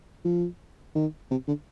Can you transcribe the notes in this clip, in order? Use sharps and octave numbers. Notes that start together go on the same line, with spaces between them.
F3
D#3
C3
D3